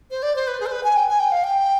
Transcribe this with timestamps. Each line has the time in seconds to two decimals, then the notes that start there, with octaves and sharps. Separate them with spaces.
0.11 C5
0.23 D5
0.36 C5
0.47 B4
0.60 G#4
0.66 C5
0.72 B4
0.84 G#5
0.96 G5
1.09 G#5
1.20 G5
1.32 F5
1.44 G5